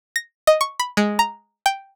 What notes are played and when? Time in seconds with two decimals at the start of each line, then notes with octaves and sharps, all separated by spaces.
0.16 A#6
0.47 D#5
0.61 C#6
0.79 B5
0.97 G#3
1.19 A#5
1.66 G5